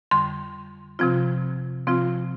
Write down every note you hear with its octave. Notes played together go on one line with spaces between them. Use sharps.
F2 D3 G3 C6
C3 F3 C4 F4
C3 F3 C4 F4